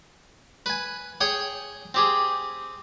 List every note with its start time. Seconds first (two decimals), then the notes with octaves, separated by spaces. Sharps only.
0.66 B4 G#5
1.21 G#4 C#5 G5 G#5
1.94 C4 G4 G#4